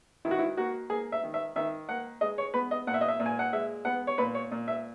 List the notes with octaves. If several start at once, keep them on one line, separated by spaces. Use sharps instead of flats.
D#3 E4
F#4
E4
A#3 F#4
A#3 G#4
E5
D#3
E5
D#3 E5
A#3 F#5
G#3 D#5
C#5
B3 B4
D#5
A#2 F#5
E5
D#5
E5
A#2
G#5
F#5
G#3 E5
B3 F#5
C#5
A#2 B4
C#5
A#2
E5